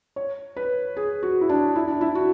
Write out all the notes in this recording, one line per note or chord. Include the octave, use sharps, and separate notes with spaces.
C#5
B4
G#4
F#4
E4
D4
E4
D4
E4
F#4